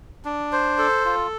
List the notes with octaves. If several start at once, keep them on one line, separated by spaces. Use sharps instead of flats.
D4
C5
A4
F4